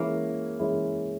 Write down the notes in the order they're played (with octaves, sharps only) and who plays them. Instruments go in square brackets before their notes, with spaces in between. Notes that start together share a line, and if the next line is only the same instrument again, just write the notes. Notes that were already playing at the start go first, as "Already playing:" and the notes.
Already playing: [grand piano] E3 G#3 C#4 E4 [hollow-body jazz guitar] A#3
[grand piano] E3 G#3 C#4 E4